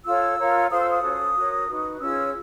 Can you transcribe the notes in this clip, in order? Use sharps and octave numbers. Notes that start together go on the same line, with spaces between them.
F4 A4 C#5 E6
F4 A#4 C#5
F4 A4 C5 D#6
E6
D#6
C#4 F#4 A4
F#4 A#4 C#5
D#4 F#4 B4
C#4 F4 G#4 C#5 E6